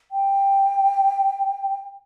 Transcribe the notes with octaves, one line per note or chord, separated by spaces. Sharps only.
G5